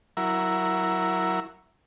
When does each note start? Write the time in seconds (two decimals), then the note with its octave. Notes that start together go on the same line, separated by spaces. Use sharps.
0.17 F#3 E4 A#4